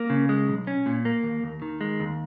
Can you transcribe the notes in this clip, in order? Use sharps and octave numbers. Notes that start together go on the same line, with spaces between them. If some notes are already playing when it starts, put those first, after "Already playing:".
Already playing: A#3
C#3
G#3
B1
C#4
A#2
A#3
D#2
D#2
D#3
G#3
D#2